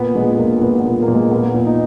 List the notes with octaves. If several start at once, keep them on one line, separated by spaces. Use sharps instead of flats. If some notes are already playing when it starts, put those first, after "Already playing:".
Already playing: A#2 B3
A#2 G#3
A#2 A#3
A#3
A#2 B3
B3
A#2
A#3
A#2
G#3
A#2 B3
A#2
D#4